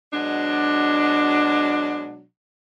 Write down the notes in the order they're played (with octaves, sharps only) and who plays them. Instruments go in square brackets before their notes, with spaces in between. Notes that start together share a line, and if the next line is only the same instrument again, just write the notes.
[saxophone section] B2 F#3 G#3 D4